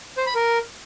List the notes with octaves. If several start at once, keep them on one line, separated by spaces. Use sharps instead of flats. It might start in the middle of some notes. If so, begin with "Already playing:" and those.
C5
B5
A#4